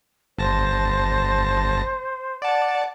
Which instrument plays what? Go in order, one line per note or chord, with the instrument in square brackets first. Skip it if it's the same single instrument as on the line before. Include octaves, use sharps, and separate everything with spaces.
[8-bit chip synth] G1 A5 A#6 [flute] C5
[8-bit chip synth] D5 A5 [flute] F#5